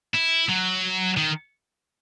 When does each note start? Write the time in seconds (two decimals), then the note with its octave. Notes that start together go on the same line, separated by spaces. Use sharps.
0.15 E4
0.49 F#3
1.17 D#3